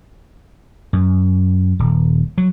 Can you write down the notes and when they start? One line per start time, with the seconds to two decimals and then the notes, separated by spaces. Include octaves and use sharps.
0.93 F#2
1.79 D#1
2.38 F#3